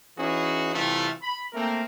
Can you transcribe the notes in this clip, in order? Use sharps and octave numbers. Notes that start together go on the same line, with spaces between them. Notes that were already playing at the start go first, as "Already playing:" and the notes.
E3 C#4 D#4 F#4 G#4
C3 E3 G3 A3 F4
B5
A3 A#3 C4 A#4